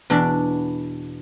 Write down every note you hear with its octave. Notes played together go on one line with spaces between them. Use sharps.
E2 B2 D4 D5